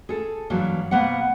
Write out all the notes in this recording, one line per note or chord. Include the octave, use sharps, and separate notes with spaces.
G#4 A4
G2 E3 F#3 A#3
B2 A#3 B3 C5 F#5